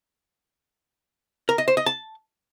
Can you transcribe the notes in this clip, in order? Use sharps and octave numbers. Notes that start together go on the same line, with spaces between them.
A#4
D#5
C5
D#5
A5